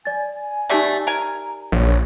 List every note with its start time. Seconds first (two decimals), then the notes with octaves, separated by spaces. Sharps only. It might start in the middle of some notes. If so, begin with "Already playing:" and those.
0.05 D5 G#5 A6
0.69 B2 G3 A3 D#4 G4 D5
1.07 A#4 G#5 A#5
1.72 A#1 C#5